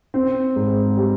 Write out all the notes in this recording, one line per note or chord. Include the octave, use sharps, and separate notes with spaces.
C4
G#2
G3